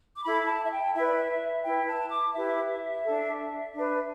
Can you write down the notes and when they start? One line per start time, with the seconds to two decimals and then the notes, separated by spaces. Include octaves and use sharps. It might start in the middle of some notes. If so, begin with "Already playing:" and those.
0.16 D6
0.24 E4 A4 B5
0.47 A5
0.64 E5
0.70 G5
0.94 E4 B4 E5
1.06 D5
1.17 E5
1.64 E4 B4 G5
1.87 A5
2.10 D6
2.33 E4 G4 B4 E5
3.03 D4 A4
3.73 D4 B4